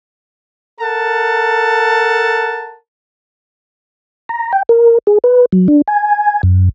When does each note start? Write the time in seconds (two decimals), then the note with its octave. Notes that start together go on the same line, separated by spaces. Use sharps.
0.81 A4 A#4 F#5 A5
4.29 A#5
4.53 G5
4.69 A#4
5.07 G#4
5.24 B4
5.52 F#3
5.68 D4
5.88 G#5
6.43 F#2